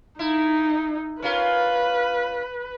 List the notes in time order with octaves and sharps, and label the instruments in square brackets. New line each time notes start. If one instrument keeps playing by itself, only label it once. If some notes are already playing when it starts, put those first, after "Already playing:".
[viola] D#4 [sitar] E4
[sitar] C#4 F4 A#4 [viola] B4